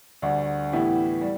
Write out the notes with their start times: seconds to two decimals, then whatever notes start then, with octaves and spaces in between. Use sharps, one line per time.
0.22 D2 D3 G3 D4
0.72 A2 E3 B3 E4 G4
1.21 G3